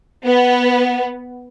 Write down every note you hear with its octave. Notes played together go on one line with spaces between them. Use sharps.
B3